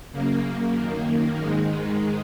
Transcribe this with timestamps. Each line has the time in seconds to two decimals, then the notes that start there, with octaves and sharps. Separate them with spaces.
0.12 F#2 C#3 A#3
0.77 F#2 D#3
1.40 G#2 D#3 G#3